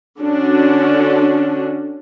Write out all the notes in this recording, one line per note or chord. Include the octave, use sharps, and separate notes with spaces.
D3 C#4 D4 F#4